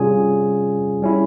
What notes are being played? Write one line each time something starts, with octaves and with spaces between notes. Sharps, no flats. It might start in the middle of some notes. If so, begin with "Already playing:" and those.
Already playing: C3 G3 C#4 F4 G#4 G#5
G3 C#4 E4